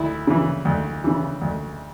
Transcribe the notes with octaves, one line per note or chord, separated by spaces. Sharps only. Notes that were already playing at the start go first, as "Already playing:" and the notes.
Already playing: D2 E4
C#3 E3
D2
C#3 E3
D2